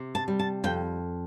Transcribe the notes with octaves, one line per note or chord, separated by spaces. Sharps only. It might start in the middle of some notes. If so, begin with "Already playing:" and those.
Already playing: C3
A5
G3
A5
F2 G5